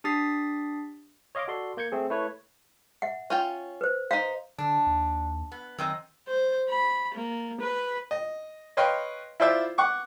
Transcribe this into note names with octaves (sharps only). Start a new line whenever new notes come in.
D4 G4 D#6 A6 B6 C7
C#5 D#5 F5 C6 D6
F#4 A4 D5 C6
A#3 G6 G#6 C#7
A3 C4 G#4
A3 E4 B4 C#5
E5 F#5
C#4 F4 G5
B4 C5
D#4 C5 F5
D3 D4
D#2
B3
F#2 D#3 C4 D#5
C5
B5
A#3
B4
D#5
B4 C#5 D#5 F5 G5 C6
E4 F4 C5 D5 E5
F#5 C#6 D6